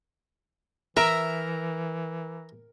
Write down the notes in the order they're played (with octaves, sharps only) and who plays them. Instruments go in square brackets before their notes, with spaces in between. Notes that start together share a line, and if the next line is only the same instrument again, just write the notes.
[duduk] E3 [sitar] A#4 [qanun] E5 [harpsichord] A#5